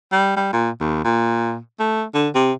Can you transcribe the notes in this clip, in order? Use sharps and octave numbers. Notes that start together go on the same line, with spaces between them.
G3
G3
A#2
D#2
A#2
A3
D3
C3